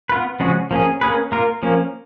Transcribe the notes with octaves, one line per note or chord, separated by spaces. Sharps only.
B3 F4 B4
C#3 F3 G#3 C#4 F#4
F3 A#3 C#4 G#4
A#3 C#4 G#4 B4
A#3 F4 A#4
F3 A#3 C#4